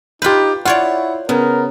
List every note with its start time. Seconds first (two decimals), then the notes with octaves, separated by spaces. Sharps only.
0.22 D#4 F4 G4 B4 G6
0.65 E4 F4 C#5 D5 F#5
1.29 C#3 B3 A#4